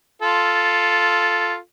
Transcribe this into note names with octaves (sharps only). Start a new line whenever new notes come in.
F4 A4